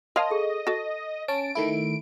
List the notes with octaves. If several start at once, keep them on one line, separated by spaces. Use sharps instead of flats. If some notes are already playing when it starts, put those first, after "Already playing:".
A#4 C#5 D#5 F5 A5 C6
G#4 A4
F#4 A4 A#6
C#4 A5 D7
D#3 A3 E4